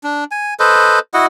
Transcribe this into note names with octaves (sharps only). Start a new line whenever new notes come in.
D4
G#5
A4 B4 C5 D#5
E4 F#4 D#5 F#5